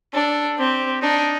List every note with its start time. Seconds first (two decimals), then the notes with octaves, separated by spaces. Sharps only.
0.14 D4 A4
0.58 C4 G4
1.02 D4 D#4